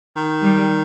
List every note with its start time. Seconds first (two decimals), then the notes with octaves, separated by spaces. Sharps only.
0.16 D#3
0.42 G3